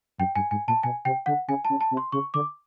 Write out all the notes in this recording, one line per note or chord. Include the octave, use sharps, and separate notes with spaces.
F#2 G5
G2 G#5
G#2 G#5
A#2 A5
B2 G#5
C3 G5
D3 F#5
C#3 G#5
A5
C#3
A5
C3
C6
C#3 C#6
D3 D6